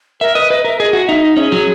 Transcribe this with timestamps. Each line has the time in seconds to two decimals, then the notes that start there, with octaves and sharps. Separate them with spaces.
0.21 A#4 E5
0.35 B4 D#5
0.50 B4 D#5
0.65 A#4 E5
0.79 G#4 D#5
0.93 F#4
1.08 D#4 E5
1.22 D#5
1.37 C#4 G#4
1.52 F#3